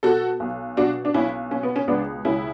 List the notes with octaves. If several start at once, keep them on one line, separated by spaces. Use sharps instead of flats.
B2 F#4 A4
B1
B2 D4 F#4
D4
B1 C#4 E4
B2 C#4
B3
C#4
C#2 B3 D4
C#2 C#4 E4